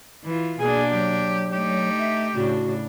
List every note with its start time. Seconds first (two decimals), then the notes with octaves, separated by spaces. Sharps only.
0.25 E3 F4
0.60 B2 A#3 D4 G#4 G#5
0.92 F#3 G4
1.52 A3 D#4 G4
1.98 E5
2.35 A2 C#3 D4 F#4